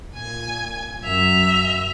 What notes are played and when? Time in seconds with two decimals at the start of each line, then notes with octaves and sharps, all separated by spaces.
0.15 A#2 G#5 G#6
1.04 F#2 E5 F7